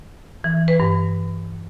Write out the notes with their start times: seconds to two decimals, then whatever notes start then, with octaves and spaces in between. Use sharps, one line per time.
0.44 E3
0.68 B4
0.80 G2